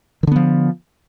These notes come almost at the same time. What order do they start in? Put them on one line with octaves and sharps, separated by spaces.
D#3 D3 B3 F3